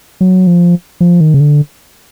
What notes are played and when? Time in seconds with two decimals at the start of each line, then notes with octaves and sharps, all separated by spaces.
0.21 F#3
0.47 F3
1.01 F3
1.21 D#3
1.34 C#3
1.40 D3